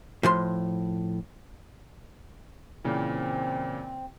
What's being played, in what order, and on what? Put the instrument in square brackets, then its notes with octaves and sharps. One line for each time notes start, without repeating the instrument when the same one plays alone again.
[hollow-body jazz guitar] A2 F3 C6
[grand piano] A#2 C#3 E3 [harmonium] C4